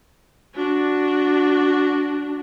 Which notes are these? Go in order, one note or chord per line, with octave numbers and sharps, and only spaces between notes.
D4 F#4